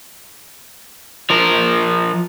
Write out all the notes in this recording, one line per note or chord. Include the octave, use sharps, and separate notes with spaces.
F3 A#4